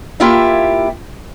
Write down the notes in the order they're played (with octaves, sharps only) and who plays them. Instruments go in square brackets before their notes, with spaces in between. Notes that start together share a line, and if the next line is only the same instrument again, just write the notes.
[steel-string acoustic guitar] A#3 E4 F4 G4 E5 F5